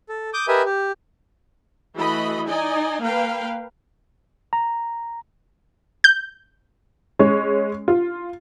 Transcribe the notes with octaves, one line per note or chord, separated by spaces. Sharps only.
A4
D6 D#6 G6
G4 A#4 B4 D#5 E5 G#5
G4
E3 A3 F#4 D#5 B5
D#4 D5 D#5 G#5
A#3 B4 F5 G5
A#5
G6
G#3 C#4 C#5
F4